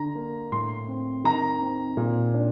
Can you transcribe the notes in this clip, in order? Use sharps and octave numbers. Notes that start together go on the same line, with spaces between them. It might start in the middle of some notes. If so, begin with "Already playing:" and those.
Already playing: D3 A#5
A#3
A2 C6
C4
D#3 A#5
C4
A#2
D4